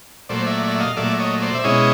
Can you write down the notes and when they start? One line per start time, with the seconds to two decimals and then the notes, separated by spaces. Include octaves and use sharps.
0.29 A#2 F#3 A3 C5 D5
0.47 D5 E5
0.63 D5 E5
0.80 D#5 F5
0.97 A#2 F#3 A3 D5 E5
1.19 C#5 D#5
1.42 C5 D5
1.55 E5
1.64 B2 G#3 C#4 E4 C#5 D#5